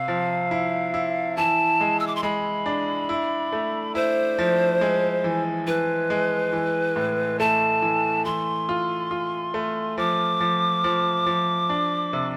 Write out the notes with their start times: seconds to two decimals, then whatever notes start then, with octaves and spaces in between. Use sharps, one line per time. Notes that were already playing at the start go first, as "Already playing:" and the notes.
Already playing: C3 F5
0.08 F3
0.51 E4
0.94 E4
1.37 E3 A5
1.81 G#3
2.00 E6
2.07 D6
2.16 C6
2.23 G#3 B5
2.66 D4
3.09 E4
3.52 A3
3.95 E4 C5
4.39 F3
4.81 G#3
5.24 E3
5.67 E3 B4
6.10 G#3
6.53 E3
6.96 A2
7.39 A3 A5
7.82 E3
8.25 E3 C6
8.69 F4
9.11 F4
9.54 A3
9.98 F3 D6
10.41 F3
10.84 F3
11.27 F3
11.69 D4
12.13 C3